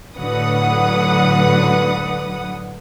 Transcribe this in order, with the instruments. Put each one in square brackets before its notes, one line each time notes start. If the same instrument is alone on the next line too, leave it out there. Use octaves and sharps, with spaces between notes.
[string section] A2 D3 F#3 B4 F#5 D#6